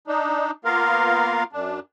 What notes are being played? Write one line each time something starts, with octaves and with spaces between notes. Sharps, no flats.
D4 D#4
A#3 B3 F4 A#4 F5
F#2 D4